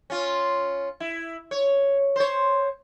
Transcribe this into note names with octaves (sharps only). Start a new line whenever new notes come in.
C#4 F4
E4
C#5
C5 C#5